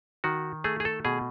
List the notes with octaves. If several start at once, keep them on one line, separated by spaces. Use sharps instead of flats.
D#3 F#4
A3 G#4
G#4
A4
B2 G#4